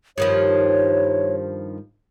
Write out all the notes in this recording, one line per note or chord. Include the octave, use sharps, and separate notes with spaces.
G2 D#3 F3 C#5